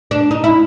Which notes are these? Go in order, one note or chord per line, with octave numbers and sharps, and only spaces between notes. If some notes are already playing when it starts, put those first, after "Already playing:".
D4
D#4
E4